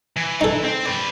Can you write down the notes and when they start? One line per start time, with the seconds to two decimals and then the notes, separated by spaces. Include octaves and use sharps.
0.16 E3
0.41 D#4 A4
0.63 C4
0.85 B4 D5